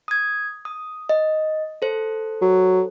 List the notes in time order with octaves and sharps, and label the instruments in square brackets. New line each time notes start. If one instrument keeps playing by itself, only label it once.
[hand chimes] D#6 G#6
D#6
D#5
A4 C5
[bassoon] F#3